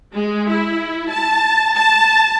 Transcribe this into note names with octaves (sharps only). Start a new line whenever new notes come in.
G#3
E4
A5
A5